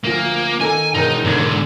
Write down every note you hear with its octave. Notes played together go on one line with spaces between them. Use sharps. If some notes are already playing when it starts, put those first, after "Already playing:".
D2 F3 A#3
D#3 A4 G#5 A#5
E1 D#4 A#4
E1 G#2 D3 A#3 G#6